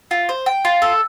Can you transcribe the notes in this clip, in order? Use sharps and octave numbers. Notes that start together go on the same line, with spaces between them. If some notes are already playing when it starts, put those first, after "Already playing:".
F4
C5
G5
F4
A4